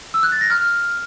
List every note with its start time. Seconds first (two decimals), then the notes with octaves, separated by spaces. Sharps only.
0.14 E6
0.23 F#6
0.32 A6
0.41 A#6
0.50 F6